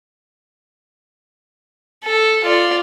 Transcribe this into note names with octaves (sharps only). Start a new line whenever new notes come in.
A4
F4 D5